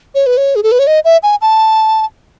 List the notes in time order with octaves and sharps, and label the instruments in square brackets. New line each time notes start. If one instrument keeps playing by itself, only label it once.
[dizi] C#5
B4
C#5
G#4
A4
B4
C#5
D#5
E5
G#5
A5